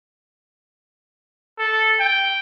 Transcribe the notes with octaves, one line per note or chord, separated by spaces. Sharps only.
A4
G5